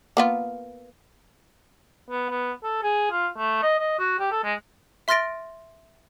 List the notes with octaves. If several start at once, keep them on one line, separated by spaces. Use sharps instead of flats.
A#3 B3 F4
B3
B3
A4
G#4
F4
A3
D#5
D#5
F#4
G4
A4
G#3
E5 C6 F6 A6 A#6 D7